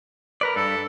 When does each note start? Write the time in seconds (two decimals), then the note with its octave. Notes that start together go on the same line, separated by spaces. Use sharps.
0.41 A#4 B4 D5
0.56 G2 A4